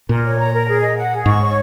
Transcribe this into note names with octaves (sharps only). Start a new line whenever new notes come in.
A#2 A#4
C#5
A#5
A#4
G#4
D#5
F#5
G#4
G#2 C#6
C#5